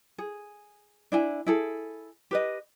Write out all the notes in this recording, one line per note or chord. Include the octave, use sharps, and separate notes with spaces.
G#4
D4 E4 G#5
E4 G#4 A4
G4 B4 D#5